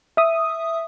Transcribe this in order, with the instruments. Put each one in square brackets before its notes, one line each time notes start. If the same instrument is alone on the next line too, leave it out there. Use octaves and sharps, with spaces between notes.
[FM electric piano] E5 D#6